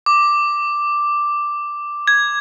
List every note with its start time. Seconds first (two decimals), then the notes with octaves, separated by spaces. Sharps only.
0.06 D6
2.08 G#6